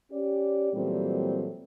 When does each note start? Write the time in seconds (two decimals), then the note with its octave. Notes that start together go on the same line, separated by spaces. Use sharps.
0.12 C#4 G4 D5
0.74 A#2 E3 F#3 G3 A3 C4